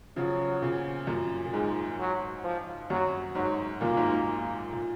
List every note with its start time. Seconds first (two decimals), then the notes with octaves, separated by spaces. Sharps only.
0.16 C#3 F3 F#3
0.62 A#2 C#3
1.07 F#2 A#2
1.46 A#2
1.53 G#2 G#3
1.99 F#3
2.44 F3
2.90 F#2 F#3
3.35 G#2 F#3
3.81 F#2 A#2 A#3
3.93 A#2
3.97 G#2
4.12 G#2
4.72 A#2